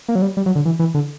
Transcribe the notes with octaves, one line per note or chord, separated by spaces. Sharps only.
A#3
F#3
G3
G3
F#3
D3
E3
E3
D3